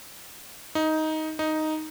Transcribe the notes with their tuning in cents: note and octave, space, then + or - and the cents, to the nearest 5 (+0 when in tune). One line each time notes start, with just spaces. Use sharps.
D#4 +10
D#4 +0